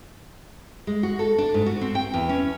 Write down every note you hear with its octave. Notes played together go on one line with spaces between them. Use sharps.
G#3
F#4
A4
D4
G#2
F#4
C4
G5
E2
C#4